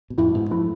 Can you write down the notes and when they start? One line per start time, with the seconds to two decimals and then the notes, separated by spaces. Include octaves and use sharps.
0.10 B2
0.18 F2 A2 E4
0.34 G#2 B2
0.51 F3 A3 E4